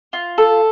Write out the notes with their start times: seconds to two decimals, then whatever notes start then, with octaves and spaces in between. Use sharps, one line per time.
0.13 F4
0.38 A4